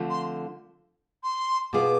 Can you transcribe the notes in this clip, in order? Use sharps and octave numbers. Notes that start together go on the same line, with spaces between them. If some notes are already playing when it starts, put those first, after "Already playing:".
Already playing: D3 F3 A3 C4 F4
C6
C6
B2 B3 F4 G#4 D6